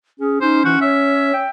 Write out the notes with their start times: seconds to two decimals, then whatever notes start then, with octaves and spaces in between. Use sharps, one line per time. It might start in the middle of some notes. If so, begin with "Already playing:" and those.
0.20 C#4 G#4
0.41 C#4 D#4 C5
0.65 E3 F#4
0.81 C#5 E5
1.34 G5